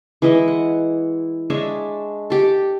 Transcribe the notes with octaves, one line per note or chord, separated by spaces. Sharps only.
E3 G#3 E4 D#5
F#5
G#3 D4 C#5 E5
G4 A4